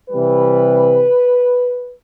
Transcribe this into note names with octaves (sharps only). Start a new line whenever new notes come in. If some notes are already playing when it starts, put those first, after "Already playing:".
C3 E3 G3 B4